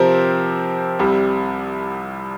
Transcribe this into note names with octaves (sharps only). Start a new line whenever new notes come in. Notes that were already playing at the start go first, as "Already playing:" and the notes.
Already playing: C3 F3 C4 G4 A#4
C2 C3 G3